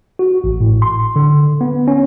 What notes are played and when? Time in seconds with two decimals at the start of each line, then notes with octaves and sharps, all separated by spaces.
0.19 F#4
0.44 A1
0.61 A2
0.82 C6
1.16 D3
1.61 B3
1.88 C#4